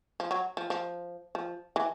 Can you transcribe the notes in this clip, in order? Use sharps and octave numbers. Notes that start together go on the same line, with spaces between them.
F3
F#3
F3
F3
F3
E3